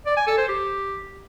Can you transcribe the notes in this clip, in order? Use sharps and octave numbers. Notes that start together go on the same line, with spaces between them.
D5
G#5
A4
C5
G4